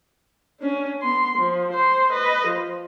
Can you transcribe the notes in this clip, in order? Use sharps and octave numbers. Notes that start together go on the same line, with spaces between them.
C#4 D4
B3 C6
F3
C5 C6
B4 D#5
F3